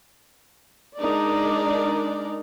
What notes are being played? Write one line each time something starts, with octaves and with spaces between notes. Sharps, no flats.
G#3 D4 D#4 A#4 D5